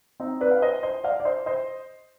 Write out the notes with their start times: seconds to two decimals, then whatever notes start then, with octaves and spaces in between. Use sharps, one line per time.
0.20 C4 D#4
0.41 B4 D5
0.51 F5
0.62 C5 D#5
0.83 C5 D#5
1.04 D5 F5
1.20 D5
1.25 C5 D#5
1.46 C5 D#5